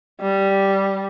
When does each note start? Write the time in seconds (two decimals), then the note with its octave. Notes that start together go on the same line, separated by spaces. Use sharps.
0.21 G3